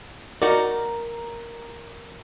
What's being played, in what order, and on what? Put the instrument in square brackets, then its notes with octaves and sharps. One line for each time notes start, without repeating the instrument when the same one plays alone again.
[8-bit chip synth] D#4 F#4 D5 [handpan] A#4